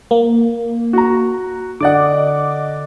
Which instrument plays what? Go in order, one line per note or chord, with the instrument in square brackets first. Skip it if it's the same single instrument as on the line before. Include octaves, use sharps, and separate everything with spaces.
[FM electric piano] A#3
[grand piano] F#4 A#5
[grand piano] D3 D5 F#5 [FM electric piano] D#5 D6